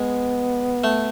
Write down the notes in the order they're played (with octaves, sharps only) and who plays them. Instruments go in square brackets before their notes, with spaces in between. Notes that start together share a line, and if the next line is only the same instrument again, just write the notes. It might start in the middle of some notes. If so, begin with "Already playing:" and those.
Already playing: [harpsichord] G#3 [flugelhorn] B3
[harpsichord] A3